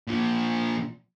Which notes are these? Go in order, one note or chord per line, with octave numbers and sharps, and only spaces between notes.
A#2 F3